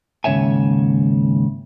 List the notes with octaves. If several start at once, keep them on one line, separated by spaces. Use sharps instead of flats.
D#2 G#2 C#3 C#5 E5 G#5